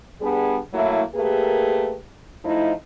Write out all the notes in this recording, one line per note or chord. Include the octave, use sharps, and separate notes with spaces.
G3 B3 D4 G#4
F#3 A3 A#3 E4
A3 A#3 G4 G#4 A#4 B4
F3 A3 D#4 E4